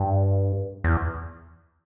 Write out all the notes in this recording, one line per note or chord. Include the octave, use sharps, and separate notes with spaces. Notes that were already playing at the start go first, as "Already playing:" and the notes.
Already playing: G2
E2